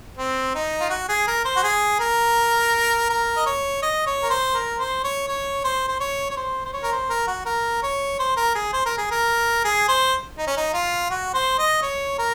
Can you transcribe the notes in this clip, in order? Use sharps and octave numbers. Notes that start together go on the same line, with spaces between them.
C4
D#4
F4
F#4
G#4
A#4
C5
F#4
G#4
A#4
A#4
D#5
C#5
D#5
C#5
A#4
C5
A#4
C5
C#5
C#5
C5
C5
C#5
C#5
C5
C5
C#5
A#4
C5
A#4
F#4
A#4
C#5
C5
A#4
G#4
C5
A#4
G#4
A#4
G#4
C5
D#4
C#4
D#4
F4
F#4
C5
D#5
C#5
A#4